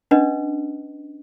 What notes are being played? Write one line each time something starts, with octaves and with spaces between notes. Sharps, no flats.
C#4 D4 B4 D#5